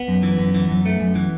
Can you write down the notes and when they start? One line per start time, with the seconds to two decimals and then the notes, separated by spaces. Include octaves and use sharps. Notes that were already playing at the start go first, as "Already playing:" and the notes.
Already playing: B3
0.08 F#2
0.23 E3
0.39 F#2
0.55 E3
0.69 F#2
0.86 A3
1.00 F#2
1.15 E3